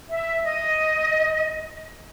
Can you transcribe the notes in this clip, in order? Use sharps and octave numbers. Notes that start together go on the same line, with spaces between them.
E5
D#5